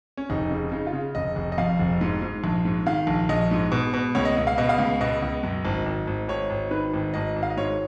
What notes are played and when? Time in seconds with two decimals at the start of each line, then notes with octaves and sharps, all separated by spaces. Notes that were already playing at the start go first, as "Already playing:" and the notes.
0.17 C#4
0.30 F1 D#4
0.51 C#3
0.72 C#3 D#4
0.87 F4
0.93 C#3
1.15 F1 D#5
1.36 F1
1.52 D#5
1.58 F2 F5
1.79 F1
2.01 G#2
2.22 G#2
2.44 A#1
2.65 G#2
2.86 D#3 F5
3.07 A#1
3.29 A#1 D#5
3.51 G#2
3.72 B2
3.94 B2
4.15 C#2 C#5
4.25 D#5
4.37 C#2
4.47 F5
4.58 B2 D#5
4.69 F5
4.78 C#2
5.01 B2 D#5
5.22 C#2
5.43 F#2
5.65 G#1
5.86 G#1
6.07 G#1
6.28 G#1 C#5
6.50 G#1
6.71 D#3 B4
6.93 G#1
7.14 G#1 D#5
7.36 G#1
7.43 F5
7.50 D#5
7.57 G#2 C#5